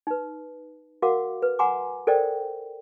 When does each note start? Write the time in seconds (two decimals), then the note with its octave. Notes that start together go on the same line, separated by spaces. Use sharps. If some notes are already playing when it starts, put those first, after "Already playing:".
0.07 D#4 B4
1.02 F#4 A#4 F5 F#5 D6
1.42 B4
1.59 F#5 G#5 A#5 C6 D6
2.07 A4 A#4 C5 D5 D#5 G5